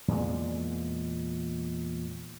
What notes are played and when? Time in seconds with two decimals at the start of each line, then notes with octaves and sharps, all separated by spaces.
0.08 E2 A#2 G#3